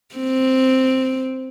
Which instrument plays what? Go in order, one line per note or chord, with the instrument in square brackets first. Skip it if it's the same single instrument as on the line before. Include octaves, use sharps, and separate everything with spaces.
[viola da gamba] C4